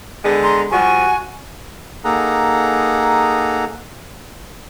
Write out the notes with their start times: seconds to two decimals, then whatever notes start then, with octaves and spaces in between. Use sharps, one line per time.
0.25 D3 G#3 B3
0.42 A#5 C6
0.71 F3 G3 F#4 G#5 C#6
2.05 A#3 D#4 G#4 A4 F#5 A#5